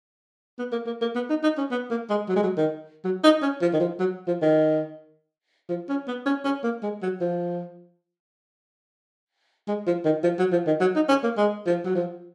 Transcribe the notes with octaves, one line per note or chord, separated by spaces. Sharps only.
B3
A#3
A#3
A#3
B3
D#4
D#4
C#4
B3
A#3
G#3
F#3
G#3
F#3
D#3
F#3
D#4
C#4
F3
D#3
F3
F#3
F3
D#3
F3
C#4
B3
C#4
C#4
A#3
G#3
F#3
F3
G#3
F3
D#3
F3
F#3
F3
D#3
F#3
D#4
C#4
A#3
G#3
F3
F#3
F3